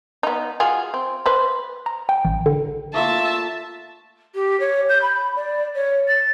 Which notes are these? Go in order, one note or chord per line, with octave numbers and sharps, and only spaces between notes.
B3 D#4
F4 F#4 G#4
C4
B4 C5
A#5
G5
A1
D3
A3 A#3 F4 E5 A5
G4
C#5
G6
B5
D5
C#5
A6